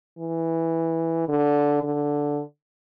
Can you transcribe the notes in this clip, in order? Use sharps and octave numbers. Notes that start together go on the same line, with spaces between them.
E3
D3
D3